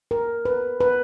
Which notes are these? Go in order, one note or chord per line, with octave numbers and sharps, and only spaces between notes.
A#4
B4
B4